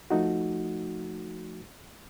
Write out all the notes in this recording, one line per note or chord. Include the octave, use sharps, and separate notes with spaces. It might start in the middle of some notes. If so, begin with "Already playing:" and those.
F3 A3 D#4 F#4